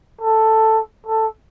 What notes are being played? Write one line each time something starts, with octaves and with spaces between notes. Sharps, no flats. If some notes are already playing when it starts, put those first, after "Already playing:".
A4
A4